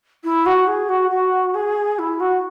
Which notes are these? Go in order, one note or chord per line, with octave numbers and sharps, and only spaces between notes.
E4
F#4
G#4
F#4
F#4
G#4
E4
F#4